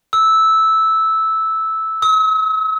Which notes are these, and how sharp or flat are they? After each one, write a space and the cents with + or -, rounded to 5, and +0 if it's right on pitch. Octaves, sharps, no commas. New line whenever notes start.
E6 -10
E6 -45